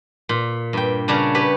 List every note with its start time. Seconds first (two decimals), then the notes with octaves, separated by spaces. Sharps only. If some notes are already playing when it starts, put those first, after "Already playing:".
0.29 A#2
0.73 G2 G5
1.08 C#3 G3 D4 A#4 C#5
1.35 G4 B4 C#5